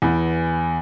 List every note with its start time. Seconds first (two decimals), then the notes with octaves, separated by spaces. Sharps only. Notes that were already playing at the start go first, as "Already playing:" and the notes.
0.02 E2 B3